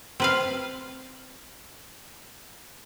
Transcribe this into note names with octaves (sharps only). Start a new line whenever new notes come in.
C4 B4 F5